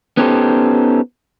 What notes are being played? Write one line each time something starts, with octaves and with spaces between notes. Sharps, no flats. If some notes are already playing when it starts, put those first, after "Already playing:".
B3 C#4 D#4 G4 A4 C5